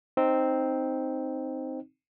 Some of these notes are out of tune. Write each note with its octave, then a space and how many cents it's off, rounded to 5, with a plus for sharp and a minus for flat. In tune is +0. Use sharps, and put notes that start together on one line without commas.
C4 +0 D#4 +0